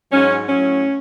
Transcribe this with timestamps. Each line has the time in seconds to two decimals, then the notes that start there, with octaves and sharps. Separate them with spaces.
0.11 G#2 F#3 C#4
0.48 A2 F#3 C#4